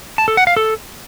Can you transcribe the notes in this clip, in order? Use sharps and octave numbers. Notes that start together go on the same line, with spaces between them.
A5
A4
F#5
F5
A4